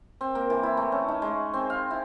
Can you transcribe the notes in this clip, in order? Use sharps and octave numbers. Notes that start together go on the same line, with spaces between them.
C4
A#3
E3
E4
A3
C#4
D#4
G#3
C4
F5
E4